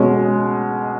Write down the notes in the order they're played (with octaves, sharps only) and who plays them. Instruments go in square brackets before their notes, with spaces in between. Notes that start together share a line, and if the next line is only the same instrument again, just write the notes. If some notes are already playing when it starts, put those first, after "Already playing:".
Already playing: [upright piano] B2 G#3 C#4